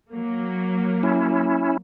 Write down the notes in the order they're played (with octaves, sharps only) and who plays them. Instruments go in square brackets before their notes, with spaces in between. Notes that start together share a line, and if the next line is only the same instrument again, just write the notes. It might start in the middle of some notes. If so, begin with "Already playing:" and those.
[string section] F#3 A#3
[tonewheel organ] C#4 E4